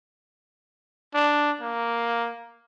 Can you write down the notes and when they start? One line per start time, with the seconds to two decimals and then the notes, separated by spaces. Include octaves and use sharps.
1.14 D4
1.61 A#3